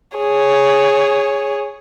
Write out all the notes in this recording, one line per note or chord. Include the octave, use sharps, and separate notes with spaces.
G#4 C#5